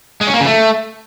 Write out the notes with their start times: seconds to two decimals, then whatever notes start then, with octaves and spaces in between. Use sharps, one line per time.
0.21 G#3
0.27 C#4
0.34 A#3
0.40 C#3
0.46 A3